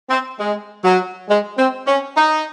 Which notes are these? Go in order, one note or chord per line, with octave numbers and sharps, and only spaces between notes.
C4
G#3
F#3
G#3
C4
C#4
D#4